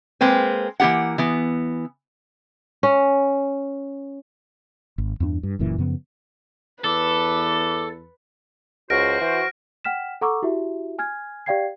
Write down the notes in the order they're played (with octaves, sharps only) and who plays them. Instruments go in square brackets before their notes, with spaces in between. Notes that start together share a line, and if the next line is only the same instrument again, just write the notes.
[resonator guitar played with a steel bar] G#3 A#3 C4 B4
E3 A#3 F4 G4 F#5
E3 B3
[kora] C#4
[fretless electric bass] G#1
E2 G2 C4 D4
G2
F#1 F#2 A#2 E3
F#2 C#3 F3 B3
[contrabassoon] E2 [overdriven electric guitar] A4 [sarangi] B4 [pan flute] D6
[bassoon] C#2 [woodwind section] F#4 C5 [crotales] F6 A#6 D7
[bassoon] E3
[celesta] F#5 G5 F6 B6 E7
A4 F#5 A#5 C#6 D6 E6
E4 F#4 G4 E5
G#5 F6 G#6
G4 D5 F5 G5 G#6 C7